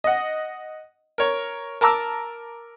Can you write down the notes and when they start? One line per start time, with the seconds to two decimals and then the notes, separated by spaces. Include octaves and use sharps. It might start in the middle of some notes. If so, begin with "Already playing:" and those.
0.04 D#5 F#5
1.18 A#4 C#5
1.81 A#4 A5 A#5 D6 E6